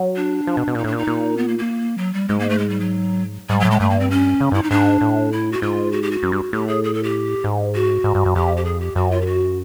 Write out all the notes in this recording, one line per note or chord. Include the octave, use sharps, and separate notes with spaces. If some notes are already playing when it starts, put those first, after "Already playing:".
Already playing: F#3
D4
F3
B2
B2
A#2 D#4
A2 D4
A#2
D#4
A#2
B3
A#3
A#3
F#3
G3
G#2 G#3
A#3
A3
G#3
G3
F#3
G#2 G3
A2 F#3
G#3
G2 A3
A#3
C4
C#4
C#3
G2 E4
D#4
G#2 D4
A2
E4
F#4
G#2 F4
F#4
G4
F#4
F#2
G2
A2 G4
G#4
G#4
A4
G4
G#2
F#4
G#2
G2
F#2
F2 G4
G4
G#4
G4
F#2 F#4
F4
G4
F#4